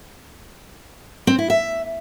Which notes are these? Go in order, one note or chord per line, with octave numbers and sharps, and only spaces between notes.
C4
E4
E5